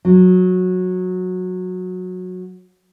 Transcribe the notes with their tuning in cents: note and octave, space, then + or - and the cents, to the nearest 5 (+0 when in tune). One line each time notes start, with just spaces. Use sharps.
F#3 -15